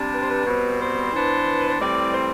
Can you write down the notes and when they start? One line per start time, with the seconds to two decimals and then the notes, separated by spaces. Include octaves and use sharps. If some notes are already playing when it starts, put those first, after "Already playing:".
Already playing: C3 G3 D4
0.12 B4
0.21 C5
0.28 B4
0.46 B2 G3 C4
0.79 C5
1.12 E3 B3 D4
1.58 B4
1.69 C5
1.79 A2 E3 G3 C4 D5
2.13 C5